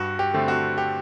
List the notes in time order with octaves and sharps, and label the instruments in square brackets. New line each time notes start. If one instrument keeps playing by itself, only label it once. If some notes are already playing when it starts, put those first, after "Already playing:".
Already playing: [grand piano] G2 F#4
G4
D3 A3 C4
F#4
G4